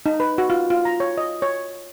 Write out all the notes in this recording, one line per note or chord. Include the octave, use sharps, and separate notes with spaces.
D#4
B4
F#4
F4
F4
A#5
C#5
D#5
C#5